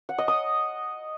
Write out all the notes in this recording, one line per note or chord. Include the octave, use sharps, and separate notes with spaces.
F#5
D#5
D#6